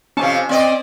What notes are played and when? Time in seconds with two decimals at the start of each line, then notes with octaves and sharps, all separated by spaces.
0.17 F2 C3 F3 C#4 A5
0.49 C4 D5 D#5